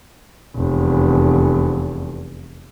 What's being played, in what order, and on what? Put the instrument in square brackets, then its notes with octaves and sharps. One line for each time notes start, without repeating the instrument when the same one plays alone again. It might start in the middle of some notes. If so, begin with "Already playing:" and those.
[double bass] F1 E2